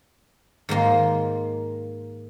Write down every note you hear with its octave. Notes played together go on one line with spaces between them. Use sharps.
G#2 D#3 A#3 C6